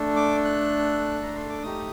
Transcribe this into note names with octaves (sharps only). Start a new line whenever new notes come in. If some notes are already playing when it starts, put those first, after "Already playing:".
Already playing: A3 D4 A4
D6
F#6
A#5
C6
D6
A3 D#4 G4 D#6